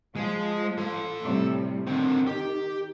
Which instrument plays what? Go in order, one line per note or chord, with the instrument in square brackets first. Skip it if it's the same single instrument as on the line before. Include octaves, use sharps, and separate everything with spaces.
[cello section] F3 [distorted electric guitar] G#3
[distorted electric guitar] A4 C6
[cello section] A2 C3 G3
[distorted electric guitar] D3 C4 [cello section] D#3
[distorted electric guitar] G4